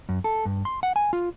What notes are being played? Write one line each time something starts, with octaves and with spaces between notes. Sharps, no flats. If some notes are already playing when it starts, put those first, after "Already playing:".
F#2
A4
G2
C6
F#5
G#5
F4